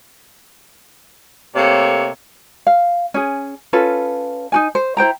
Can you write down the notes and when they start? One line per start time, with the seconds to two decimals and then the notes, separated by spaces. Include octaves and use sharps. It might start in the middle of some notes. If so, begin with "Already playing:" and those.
1.56 C3 A3 A#3 A4 C#5
2.67 F5
3.14 C#4 G#4
3.73 C#4 F4 A4 B4
4.52 D#4 F#4 G#5
4.75 C5
4.97 E4 C5 G5 A#5